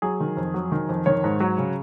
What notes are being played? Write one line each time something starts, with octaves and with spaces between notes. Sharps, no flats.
F#3 G#4
D#3
F2
F#3
D#3
F2
D#3 C#5
G#2
F#3
C#3